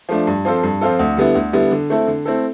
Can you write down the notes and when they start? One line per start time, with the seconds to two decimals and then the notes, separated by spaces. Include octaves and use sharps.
0.09 F3 A3 D4
0.27 G2
0.45 F3 C4 F4 A4
0.63 G2
0.81 F3 C4 F4 A4
0.99 D2
1.17 D3 G3 B3 E4
1.35 D2
1.53 D3 G3 B3 E4
1.71 D3
1.90 A3 C4 E4 A4
2.07 D3
2.25 A3 C4 E4 A4